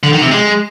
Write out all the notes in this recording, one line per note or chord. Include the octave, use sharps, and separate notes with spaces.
D3
D#3
C3
G#3